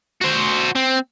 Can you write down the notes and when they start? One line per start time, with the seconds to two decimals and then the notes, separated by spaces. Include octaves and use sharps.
0.22 F#4 C5
0.76 C4